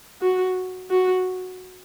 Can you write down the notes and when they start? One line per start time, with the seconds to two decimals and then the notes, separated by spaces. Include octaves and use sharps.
0.22 F#4
0.90 F#4